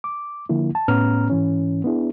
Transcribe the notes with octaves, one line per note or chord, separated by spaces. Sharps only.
D6
D3 F3 A#3 E4
A5
A2 B3 C#4 B4 A#5 F6
G#2 E3 C#4
B3 D4 E4 G#4